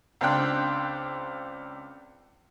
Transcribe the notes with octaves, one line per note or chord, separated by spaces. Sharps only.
C#2 C4 D4 G5 F#6